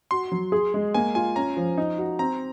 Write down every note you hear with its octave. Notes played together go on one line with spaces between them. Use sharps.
F#4 C6
F#3
G#4
G#3
A#3 G#5
F4 G#5
C#4 A#5
F3
D#4
F#4
C4 A#5